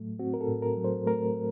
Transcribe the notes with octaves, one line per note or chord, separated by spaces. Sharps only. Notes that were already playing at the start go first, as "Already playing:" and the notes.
Already playing: A2 F#3 A3
C4 F#4
A#4
A4
A2
A#4
F#3
C5
A3 A#4